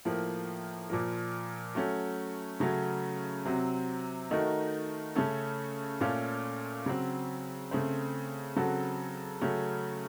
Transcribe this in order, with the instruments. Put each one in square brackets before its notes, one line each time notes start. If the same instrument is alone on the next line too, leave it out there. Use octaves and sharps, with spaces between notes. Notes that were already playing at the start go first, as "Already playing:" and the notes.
[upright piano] A2 F3 A#3
A#2 F3 A#3
F#3 A3 C#4
C#3 F#3 A3 C#4
C3 F#3 C4
D#3 A3 D#4 F#4 A#4
C#3 A3 C#4 A4
A#2 A3 C#4 F4 A4
C#3 F#3 C4
C#3 A3 C4
C#3 F#3 C4 F#4 A4
C#3 F#3 A3 C#4